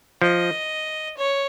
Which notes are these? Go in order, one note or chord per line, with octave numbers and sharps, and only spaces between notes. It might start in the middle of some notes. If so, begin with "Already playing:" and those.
F3 D#5
C#5